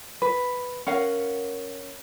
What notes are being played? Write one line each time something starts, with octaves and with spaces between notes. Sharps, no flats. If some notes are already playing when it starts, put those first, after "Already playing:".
B4
C#4 A#4 F5 F#5